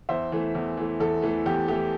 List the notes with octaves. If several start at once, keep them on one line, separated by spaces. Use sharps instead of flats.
E2 C5 E5
E3 A3
E2
E3 A3
E2 A4
E3 A3
E2 G4
E3 A3 G4